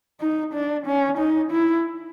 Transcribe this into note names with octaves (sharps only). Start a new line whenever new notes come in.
D#4
D4
C#4
D#4
E4